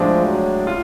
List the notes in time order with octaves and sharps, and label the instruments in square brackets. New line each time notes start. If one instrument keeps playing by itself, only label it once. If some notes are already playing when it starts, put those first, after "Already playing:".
Already playing: [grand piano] A2 G#3 D4 [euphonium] F3
[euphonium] F#3
[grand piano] F4